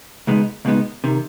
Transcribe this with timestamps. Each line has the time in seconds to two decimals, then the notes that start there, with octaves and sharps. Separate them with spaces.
0.27 C#2 B2 G#3 B3 D#4
0.65 C#2 B2 G#3 B3 D#4
1.04 C3 D#3